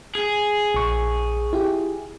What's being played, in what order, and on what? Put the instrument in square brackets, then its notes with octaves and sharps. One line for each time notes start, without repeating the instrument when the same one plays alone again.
[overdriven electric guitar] G#4
[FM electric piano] A#1 C#6
E4 F4 G4